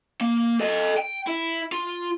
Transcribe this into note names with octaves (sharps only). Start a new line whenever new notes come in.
A#3
A4 D#5
G5
E4
F4